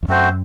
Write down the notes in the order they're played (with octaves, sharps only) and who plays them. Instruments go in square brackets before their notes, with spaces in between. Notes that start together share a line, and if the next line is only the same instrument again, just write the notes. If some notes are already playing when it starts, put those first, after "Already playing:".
[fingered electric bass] E2
[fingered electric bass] F#2 [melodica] A3 C4 F#4 C5